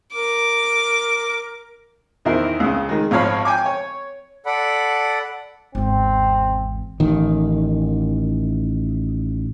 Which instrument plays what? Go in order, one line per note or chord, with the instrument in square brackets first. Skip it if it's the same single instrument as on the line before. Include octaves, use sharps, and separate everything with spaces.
[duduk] A#4 [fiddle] D6
[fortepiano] E2 D#3 E4 A#4 C5
C#2 C#3
D#3 G#3
G#1 F3 C#5 F5 B5
G5 G#5 D6
C#5
[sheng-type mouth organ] A4 D5 F#5 B5
[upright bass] G#1 E2 [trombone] C4
[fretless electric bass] A1 D#3